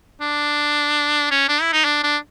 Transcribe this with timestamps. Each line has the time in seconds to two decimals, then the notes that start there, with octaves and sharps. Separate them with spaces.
0.21 D4
1.31 C#4
1.48 D4
1.62 E4
1.73 D#4
1.85 D4
2.04 D4